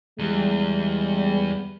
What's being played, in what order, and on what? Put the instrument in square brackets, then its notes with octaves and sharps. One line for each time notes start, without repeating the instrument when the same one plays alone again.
[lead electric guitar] E2 [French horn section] G3 G#3